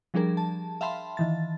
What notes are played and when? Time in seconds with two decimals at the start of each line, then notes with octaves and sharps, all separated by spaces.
0.14 F3 G3 D4 G#4 A#4
0.37 A5
0.81 E5 F5 G5 A5 B5 C6
1.17 D#3 E3 A6